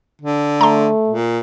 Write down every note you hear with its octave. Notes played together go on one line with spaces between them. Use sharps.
D3
A3 A#5 C6
A#2